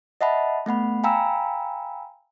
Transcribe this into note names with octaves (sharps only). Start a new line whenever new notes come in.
D#5 E5 F#5 A5 B5
A3 B3 F#5 B5
F5 G5 G#5 A#5 B5 E6